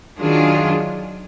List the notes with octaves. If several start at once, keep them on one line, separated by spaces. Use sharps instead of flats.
D#3 F#3 D4 F4 G#4